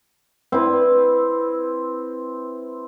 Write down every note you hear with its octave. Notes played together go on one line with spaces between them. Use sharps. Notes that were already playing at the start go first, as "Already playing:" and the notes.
C4 E4 B4